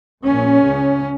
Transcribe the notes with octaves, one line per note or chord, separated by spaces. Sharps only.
A#1 A#2 C#4
C#2 C#3